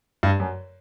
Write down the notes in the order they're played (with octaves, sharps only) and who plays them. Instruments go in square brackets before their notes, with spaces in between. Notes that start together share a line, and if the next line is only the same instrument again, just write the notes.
[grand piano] G2
F#2